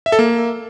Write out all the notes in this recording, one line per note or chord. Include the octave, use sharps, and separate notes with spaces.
E5
A4
A#3